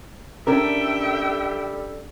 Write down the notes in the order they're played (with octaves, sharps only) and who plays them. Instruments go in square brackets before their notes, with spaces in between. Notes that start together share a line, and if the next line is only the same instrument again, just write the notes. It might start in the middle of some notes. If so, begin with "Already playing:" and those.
[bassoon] G3 [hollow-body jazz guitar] C#4 D4 A#4 [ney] A4 [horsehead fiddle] E5 G5